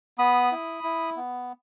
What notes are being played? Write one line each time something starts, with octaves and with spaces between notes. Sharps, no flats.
B3 B5 D#6
E4
E4
B3